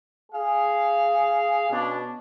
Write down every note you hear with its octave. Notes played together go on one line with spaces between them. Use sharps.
G#4 F5
B2 C#4 D4